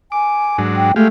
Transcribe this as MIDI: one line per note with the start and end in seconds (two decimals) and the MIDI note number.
0.12 0.60 80
0.12 0.57 86
0.58 0.92 44
0.58 0.92 54
0.58 0.92 62
0.76 0.93 79
0.96 1.08 56
0.96 1.08 57
0.96 1.08 67
0.96 1.08 77